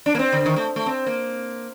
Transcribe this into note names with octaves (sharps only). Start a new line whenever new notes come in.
D4
A#3
C4
D3
D#3
A3
A3
C4
A#3